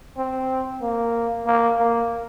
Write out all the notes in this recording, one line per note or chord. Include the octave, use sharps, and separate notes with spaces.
C4
A#3
A#3
A#3